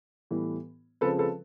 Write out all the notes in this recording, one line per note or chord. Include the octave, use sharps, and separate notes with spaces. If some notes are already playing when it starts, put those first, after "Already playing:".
A2 E3 G3 B3
C#3 F3 G#3 C4 A4 B4
A4 B4